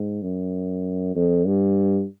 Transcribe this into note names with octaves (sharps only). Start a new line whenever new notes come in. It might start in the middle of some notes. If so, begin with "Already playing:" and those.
Already playing: G#2
F#2
F2
G2